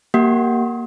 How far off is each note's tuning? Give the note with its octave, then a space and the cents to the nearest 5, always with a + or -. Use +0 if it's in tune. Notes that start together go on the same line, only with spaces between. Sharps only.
A#3 +0 G4 -20 F#5 +0